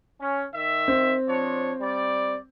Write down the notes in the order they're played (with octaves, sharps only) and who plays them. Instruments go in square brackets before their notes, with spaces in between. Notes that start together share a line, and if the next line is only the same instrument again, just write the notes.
[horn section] C#4
D#3 E5
[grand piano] C4
[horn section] F3 D4 C#5
G3 D5